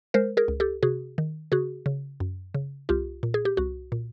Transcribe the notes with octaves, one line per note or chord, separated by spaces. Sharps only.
G#3 A#4 C5
G#4 A#4
C#2
G4 A4
C3 F#4 G#4
D#3
C#3 F#4 G#4
C#3
F#2
C#3
C2 F4 G4
A#2
G#4
G4
C2 F#4
A#2